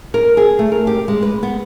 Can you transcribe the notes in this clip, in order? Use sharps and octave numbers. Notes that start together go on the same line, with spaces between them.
A#4
G#4
A3
A#4
G4
G#3
B4
B3